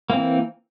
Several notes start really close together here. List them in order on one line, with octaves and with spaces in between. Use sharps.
A#3 C4 E3